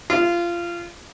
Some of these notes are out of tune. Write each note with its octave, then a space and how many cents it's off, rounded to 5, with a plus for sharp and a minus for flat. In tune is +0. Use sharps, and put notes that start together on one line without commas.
F4 -20